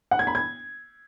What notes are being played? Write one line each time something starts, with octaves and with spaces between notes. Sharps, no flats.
F#5
G#6
B5
G#6